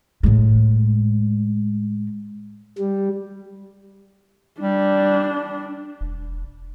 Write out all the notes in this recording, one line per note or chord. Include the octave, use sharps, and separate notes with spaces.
A2 G#3
G3
G3 D4
E1